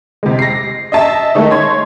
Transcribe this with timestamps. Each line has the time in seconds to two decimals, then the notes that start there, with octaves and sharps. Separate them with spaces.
0.23 C3 G#3
0.39 A#6 C7
0.92 D#5 E5 A5
1.35 D#3 G#3 A3 D#4
1.51 C#5 C6 G#6